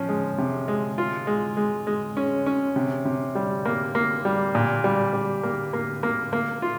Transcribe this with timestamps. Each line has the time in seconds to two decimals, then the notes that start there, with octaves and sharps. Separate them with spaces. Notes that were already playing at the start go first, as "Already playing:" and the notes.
Already playing: F3 C#4
0.09 G#3
0.38 C3
0.68 G#3
0.98 F4
1.27 G#3
1.57 G#3
1.87 G#3
2.17 C#4
2.46 C#4
2.76 C3
3.05 C3
3.35 G3
3.65 A#3
3.95 A#3
4.25 G3
4.55 A#2
4.84 G3
5.13 G3
5.43 A#3
5.73 A#3
6.03 A#3
6.33 A#3
6.62 F4